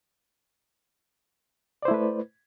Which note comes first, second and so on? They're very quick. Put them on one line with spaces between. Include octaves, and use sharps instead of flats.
D5 C5 E4 A3 B4